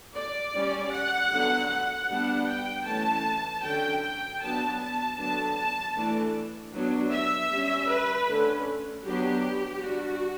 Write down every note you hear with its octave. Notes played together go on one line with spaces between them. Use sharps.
D5
G3 C#4
F#5
D3 F#3 B3
F#5
G3 B3 D4
G5
E3 A3 C#4 A5
D3 F#3 C#4 G5
G5
F#3 B3 D4 A5
A5
D3 F#3 B3 D4 A5
A5
E3 A3 D4
F#3 B3 D4
E5
G3 C#4
B4
D3 A3 C#4
F#3 B3 D4 G4
G3 D4 F#4